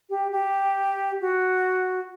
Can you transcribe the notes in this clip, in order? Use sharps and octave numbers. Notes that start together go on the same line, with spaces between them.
G4
G4
F#4